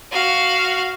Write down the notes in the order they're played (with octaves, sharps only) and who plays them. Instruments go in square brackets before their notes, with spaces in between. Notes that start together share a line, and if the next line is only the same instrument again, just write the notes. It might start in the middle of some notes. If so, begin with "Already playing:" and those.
[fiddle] F#4 F5